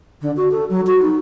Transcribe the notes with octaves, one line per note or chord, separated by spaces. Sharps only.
D3
F#4
A4
F#3
F#4
D#4